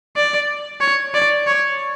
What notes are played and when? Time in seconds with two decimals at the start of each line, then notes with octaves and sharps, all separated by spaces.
0.16 D5
0.81 C#5
1.14 D5
1.48 C#5